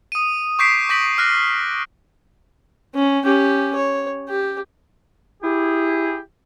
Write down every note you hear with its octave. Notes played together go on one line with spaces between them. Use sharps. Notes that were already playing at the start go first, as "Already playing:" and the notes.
D#6 D#7
C#6 D6 G6 B6 C7 D7
D6 G6 A#6 B6 D7 F#7
F6 F#6 A#6
C#4
C#4 G4
C#5
G4
E4 G4 G#4